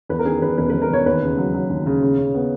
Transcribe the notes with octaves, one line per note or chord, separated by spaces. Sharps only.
E2 B4
A#4
D#3 G#4
E2 B4
E1 B4
B4
E1
A#4
E1 C#5
D#2 B4
C#3
F#3
F#3
D#2
C#3
C#3
C#3
B3